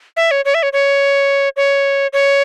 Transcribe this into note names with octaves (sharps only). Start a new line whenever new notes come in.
E5
C#5
C#5
E5
C#5
C#5
C#5
C#5